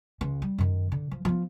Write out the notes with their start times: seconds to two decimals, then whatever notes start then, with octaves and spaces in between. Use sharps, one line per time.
0.21 C#2 G#3
0.42 G3
0.58 F#2 D#3
0.92 D3
1.11 F3
1.25 F3 B3